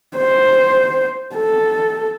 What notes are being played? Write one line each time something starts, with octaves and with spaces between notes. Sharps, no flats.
C5
A4